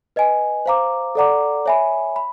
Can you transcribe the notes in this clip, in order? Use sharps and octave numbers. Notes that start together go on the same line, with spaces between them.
B4 D#5 G#5
C5 F5 A#5 D6
A4 D5 F#5 A#5 D6
C#5 E5 G#5 B5
B5